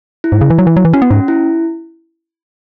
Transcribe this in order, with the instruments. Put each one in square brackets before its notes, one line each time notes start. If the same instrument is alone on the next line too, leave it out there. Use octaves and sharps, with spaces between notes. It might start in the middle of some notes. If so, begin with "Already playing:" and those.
[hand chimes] E4
[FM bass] G#2
C#3
E3
F#3
E3
F#3
E3
[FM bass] C#4 [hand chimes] F#4
[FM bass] B3
[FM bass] G#2 [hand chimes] C#4
[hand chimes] E4